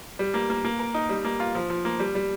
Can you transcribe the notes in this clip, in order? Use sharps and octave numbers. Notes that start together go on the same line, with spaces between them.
G3
A#3
A#3
A#3
A#4
D#4
G3
A#3
F4
F3
F3
A#3
G3
G3